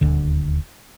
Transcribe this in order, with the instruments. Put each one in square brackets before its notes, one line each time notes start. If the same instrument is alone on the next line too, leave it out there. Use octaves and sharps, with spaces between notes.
[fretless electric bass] D#1 D2 D3